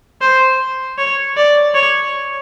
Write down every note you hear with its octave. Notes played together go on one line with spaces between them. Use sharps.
C5
C#5
D5
C#5